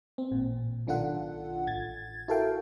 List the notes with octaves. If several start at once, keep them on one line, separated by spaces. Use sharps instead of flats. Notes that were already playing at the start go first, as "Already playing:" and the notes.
C4
A1 A#2
B1 D#3 D4 F4 A4 F#5
A1 G#6 A6
E4 F#4 A4 A#4 F5 G5